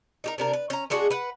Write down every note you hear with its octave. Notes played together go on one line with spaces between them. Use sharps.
D#4 G4 A#4
C3 D4 A#4
B4
C#4 A#5
G#3 D4 F#4 G#4
B4 F#5